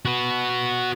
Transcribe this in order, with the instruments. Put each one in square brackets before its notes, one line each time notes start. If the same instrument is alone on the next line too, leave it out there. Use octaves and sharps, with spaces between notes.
[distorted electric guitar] F#4 B4